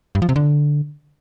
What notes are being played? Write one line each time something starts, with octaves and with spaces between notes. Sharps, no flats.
G2
F3
C3
D3